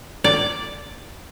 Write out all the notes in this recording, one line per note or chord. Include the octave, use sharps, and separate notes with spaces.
D5